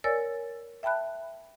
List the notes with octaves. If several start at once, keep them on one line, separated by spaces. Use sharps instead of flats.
A#4 C#5 D5 G#5 E6 A6
E5 G5 A5 B5 F#6